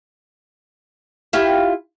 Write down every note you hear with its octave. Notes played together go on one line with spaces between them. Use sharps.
E4 F4 G4